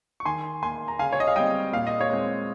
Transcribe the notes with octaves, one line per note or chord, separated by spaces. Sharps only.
C#6
D#3 G#5 C6
A#3 G#5 C6
A#5
C#3 F5 G#5
C#5
D#5
F5
G3 C4 D#5 G5
A#2 F5
D#5
C#5 F5
G#3 C4